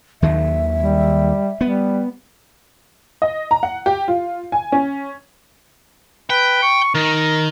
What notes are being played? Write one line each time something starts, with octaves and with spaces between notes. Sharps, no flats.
D#2 D#3 F#3 E5
G3
G3 B3
D#5
A#5
F#5
G4
F4
G#5
C#4
B4 G5
C#6
D#3 A#4